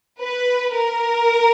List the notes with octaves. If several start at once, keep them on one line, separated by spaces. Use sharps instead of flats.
B4
A#4